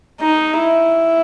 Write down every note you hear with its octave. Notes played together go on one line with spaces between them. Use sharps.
D#4
E4